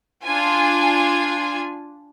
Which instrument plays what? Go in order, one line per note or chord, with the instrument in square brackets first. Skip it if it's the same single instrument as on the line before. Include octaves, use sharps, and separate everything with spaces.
[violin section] D4 F4 G#5